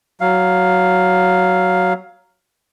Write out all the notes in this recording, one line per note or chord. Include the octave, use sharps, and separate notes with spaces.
F#3 F5